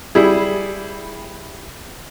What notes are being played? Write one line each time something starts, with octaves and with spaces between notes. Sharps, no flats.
G3 E4 G#4